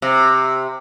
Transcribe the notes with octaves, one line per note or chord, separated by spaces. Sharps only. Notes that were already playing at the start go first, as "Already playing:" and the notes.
C3